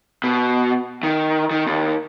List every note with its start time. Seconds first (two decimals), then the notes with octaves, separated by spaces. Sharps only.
0.24 B2
1.03 D#3
1.51 D#3
1.67 D#2